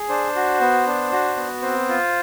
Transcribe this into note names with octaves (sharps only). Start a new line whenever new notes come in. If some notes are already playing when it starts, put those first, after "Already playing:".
Already playing: G#4
D4 C5
F#4
B3
D4
F#4
B3
C4 C5
F4